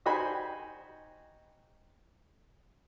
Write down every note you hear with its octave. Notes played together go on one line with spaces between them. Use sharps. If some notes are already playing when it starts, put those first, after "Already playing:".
D#4 F#4 G4 C5 G#5 B5